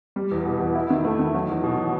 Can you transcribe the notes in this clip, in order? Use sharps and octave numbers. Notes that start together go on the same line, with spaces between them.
G3
E2
B2
E2
E4
D#3
A3
D#3
F#3
E2
B2